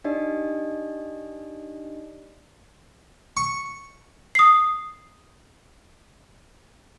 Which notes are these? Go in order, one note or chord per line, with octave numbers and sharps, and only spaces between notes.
D4 D#4 G4 D5 D#5
C#6
D#6 C7